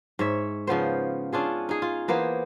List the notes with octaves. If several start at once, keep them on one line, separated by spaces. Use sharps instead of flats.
G#2 C#5 E5
C#3 F3 B3 C5
C#4 D4 F4 G#4
D#4 G#4
F4
E3 A#3 B3 C5